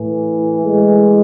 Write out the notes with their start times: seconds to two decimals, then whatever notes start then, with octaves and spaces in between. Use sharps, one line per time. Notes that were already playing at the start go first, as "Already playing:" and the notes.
Already playing: A2 E3
0.62 G#3